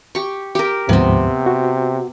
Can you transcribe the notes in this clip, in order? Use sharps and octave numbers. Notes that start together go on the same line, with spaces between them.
G4 C#6
G4 A#4
D2 G#2 C3 F3 B3 C4
F#4